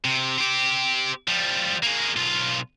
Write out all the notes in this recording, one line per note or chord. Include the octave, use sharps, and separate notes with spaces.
C3
C4 G4
F3 G3
A#3 G#4
B1 F4